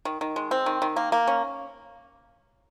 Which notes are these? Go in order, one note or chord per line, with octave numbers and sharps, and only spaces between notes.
D#3
D#3
G#3
C4
D#3
D#3
A#3
A#3
C#4